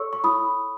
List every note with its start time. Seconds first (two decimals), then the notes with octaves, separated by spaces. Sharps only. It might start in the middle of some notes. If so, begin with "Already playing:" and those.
Already playing: A4 C#5 C#6 E6
0.13 C#6
0.24 E4 B5 D#6